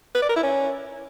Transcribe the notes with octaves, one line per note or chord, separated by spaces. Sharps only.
B4
D5
A#4
E4
C#4